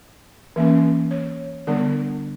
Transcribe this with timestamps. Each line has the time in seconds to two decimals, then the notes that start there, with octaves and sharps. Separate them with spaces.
0.56 E3 A#3 C#4
1.11 C#5
1.67 D3 G3 B3 D4